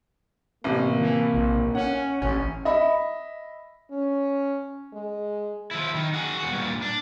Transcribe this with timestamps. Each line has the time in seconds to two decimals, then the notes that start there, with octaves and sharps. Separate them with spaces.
0.64 A1 C3 A#3
1.00 E3
1.34 A#1
1.75 C#4 F#5
2.22 A1 C#4
2.65 D#5 E5 B5
3.91 C#4
4.93 G#3
5.71 F3 E4
5.95 D#3
6.14 F#4 G#4
6.38 E2 F#4
6.53 G2 A#2
6.82 D4